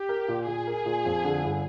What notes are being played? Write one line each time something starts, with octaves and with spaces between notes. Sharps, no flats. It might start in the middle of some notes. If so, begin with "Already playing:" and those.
Already playing: G4
A#4
A#2
A#2 G#4
A#4
A#2
F2
D3
G1